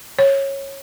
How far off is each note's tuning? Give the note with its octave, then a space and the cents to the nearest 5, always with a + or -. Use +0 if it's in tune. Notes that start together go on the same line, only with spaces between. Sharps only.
C#5 -15